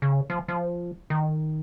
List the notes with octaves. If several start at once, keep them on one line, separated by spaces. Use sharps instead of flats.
C#3
F3
F3
D#3